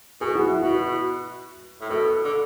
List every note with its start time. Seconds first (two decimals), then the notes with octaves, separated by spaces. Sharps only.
0.21 B2 G#4
0.35 F#4
0.48 E4
0.62 B2 F#4
1.81 A2
1.90 B2 A4
2.25 D3